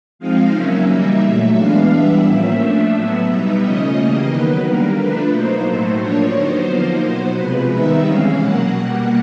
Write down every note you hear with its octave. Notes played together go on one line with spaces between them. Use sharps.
F3 G#3 C4 D#4 F5
C#3 F#3 A#3 C#4 E5
E3 G3 A#3 D#4
A#2 F#3 A3 E5
E3 G#3 B3 D4 F5
E3 G3 B3 D4 E5
A2 F3 A#3 C#4
F3 A3 D4
A2 F#3 B3 E5
B2 G3 B3 D#4
C#3 F3 A3 C#4 D#5
C#3 E3 G3 A#3
D#3 F#3 B3 D#4 B4
D3 G3 A#3 A#4
F3 A3 D4 B4
B2 F#3 A#3 D#4 C5
A2 F#3 A3
A2 F3 A#3 D4 C#5
D3 F#3 B3 D#4 C5
F3 A#3 D#4
B2 F#3 B3
C3 F3 G#3 B4
D#3 G3 B3 D#4 E5
C3 E3 G#3 C#4 F5
B2 F#3 A#3 F#5
B2 G3 A#3 F#5